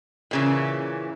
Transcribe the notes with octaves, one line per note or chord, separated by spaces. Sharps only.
A#2 C#3 E3